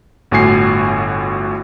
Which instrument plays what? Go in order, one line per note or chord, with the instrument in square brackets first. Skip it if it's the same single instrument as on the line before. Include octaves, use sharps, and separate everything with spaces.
[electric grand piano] G1 A2 F#4 G#5 C7